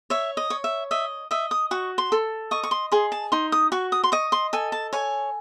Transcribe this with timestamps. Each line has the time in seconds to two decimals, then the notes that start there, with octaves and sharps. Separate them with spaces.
0.10 C#5 E5
0.37 D#5
0.50 C#5
0.64 E5
0.91 D#5 E5
1.31 D#5 E5
1.51 D#6
1.71 F#4 C#6
1.98 C6
2.12 A4
2.51 D#5 C#6
2.63 C#6
2.71 C6
2.92 G#4 C6
3.12 A5
3.32 D#4 C6
3.52 D#6
3.72 F#4 C#6
3.92 D#6
4.04 C6
4.12 D#5 C#6
4.32 C6
4.53 A4 G#5
4.72 A5
4.93 C#5 G#5